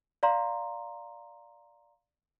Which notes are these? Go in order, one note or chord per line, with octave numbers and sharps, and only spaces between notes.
D5 F5 A#5 C6